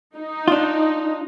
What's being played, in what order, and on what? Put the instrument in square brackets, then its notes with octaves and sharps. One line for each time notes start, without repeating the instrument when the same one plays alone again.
[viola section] D#4
[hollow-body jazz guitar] D4 F4